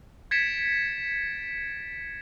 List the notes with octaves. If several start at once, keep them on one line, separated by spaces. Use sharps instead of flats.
G#6 A6 B6 C#7 D7 E7